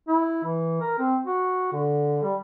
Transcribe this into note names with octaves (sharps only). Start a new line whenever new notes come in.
E4
E3
A#4
C4
F#4
D3
G3